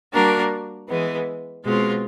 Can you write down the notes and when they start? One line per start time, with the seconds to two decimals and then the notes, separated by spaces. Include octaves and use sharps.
0.13 G3 A#3 D4 F#4 A#4
0.89 E3 G#3 B3
1.65 B2 G#3 C4 F4